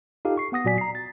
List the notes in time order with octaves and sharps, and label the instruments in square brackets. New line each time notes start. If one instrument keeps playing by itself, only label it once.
[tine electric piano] D#4 F4 G4 A4 F5
C#6 C7
B3 F#5 D#6 A#6
A#2 F#3 F#4 D5 G#5 B6
A#5 C7
A6